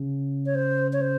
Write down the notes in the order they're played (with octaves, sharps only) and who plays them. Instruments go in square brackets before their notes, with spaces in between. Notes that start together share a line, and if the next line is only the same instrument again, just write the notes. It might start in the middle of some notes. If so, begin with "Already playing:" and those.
Already playing: [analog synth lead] C#3
[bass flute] C#5
C5
C#5
C5